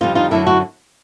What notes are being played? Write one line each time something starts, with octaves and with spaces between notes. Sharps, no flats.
F2 D3 G3 D#4 F4
D#4 F4
F#2 D3 F#3 D4 E4
E4 F#4